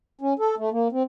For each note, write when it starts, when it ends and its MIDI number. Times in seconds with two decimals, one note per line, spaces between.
0.21 0.33 61
0.39 0.55 69
0.58 0.69 57
0.72 0.88 58
0.92 1.03 60